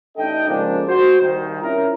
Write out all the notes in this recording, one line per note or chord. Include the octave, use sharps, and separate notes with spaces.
A1 D4 D#4 A4 D#5 G5
C#3 F3 G#3 A#3 D4
F#4 C5
C2 D#3
C4 C#4 E4 F4 A#4